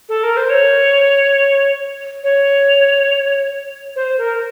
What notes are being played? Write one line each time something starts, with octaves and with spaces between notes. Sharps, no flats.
A4
A#4
C5
C#5
C#5
C5
A#4